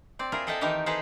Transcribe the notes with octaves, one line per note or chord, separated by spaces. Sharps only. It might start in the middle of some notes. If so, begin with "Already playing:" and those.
C4 D5
E4 F4 G#4 A#4
G#4 A4 D#5 E5 G5 A5
D#3 E3 D#4 G4 A#4 A5
G#4 A4 B4 C5 A5 A#5